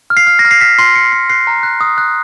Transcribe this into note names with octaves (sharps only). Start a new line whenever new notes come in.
F6
C7
F6
A#6
F6
C7
F6 B6
C6 C7
C6 C#7
C6 C7
F#6 C7
A#5
F#6
D#6
F#6